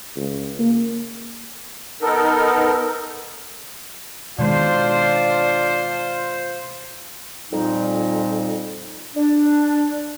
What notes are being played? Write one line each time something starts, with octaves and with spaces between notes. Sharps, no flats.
C#2
A#3
B3 D#4 A4 A#4
B2 D#3 G#3 D4 F4 C5
F2 A#2 G3 D#4
D4